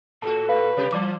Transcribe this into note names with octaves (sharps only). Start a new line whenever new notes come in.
A2 F#4 A4 A5
B4 F5
C3 G3 G4
E3 F3 G3 D5 D6